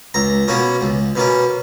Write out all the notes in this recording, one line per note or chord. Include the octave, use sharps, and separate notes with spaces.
C#2 A#5
B2 A#3 C#4
C#2
B2 A#3 C#4